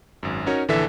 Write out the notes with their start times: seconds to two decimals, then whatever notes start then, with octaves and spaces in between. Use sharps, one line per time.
0.23 G#1 F#2
0.46 C#4 D#4 F#4 A#4 C#5
0.68 A#1 D3 E3 A4 E5 B6